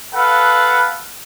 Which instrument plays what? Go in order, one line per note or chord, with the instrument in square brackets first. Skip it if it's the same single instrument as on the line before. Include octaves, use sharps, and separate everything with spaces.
[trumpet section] A4 B4 F5 F#5